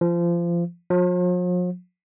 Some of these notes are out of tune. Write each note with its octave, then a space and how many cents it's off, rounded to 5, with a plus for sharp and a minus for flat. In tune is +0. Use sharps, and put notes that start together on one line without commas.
F3 -25
F3 +45